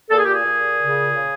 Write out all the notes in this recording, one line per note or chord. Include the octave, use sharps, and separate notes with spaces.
A#2 A4
G#4
G4
G#4
A#2
C#3
C#3